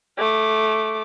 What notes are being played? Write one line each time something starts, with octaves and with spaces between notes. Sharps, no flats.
A3 D6